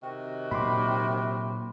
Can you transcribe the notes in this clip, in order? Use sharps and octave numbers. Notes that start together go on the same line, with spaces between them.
C3 D#3 F#4
A#2 F#3 B5 C6 D6